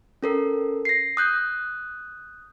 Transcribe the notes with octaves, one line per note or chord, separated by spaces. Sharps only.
C#4 A4 A#4
A#6 C7
D#6 F#6 G6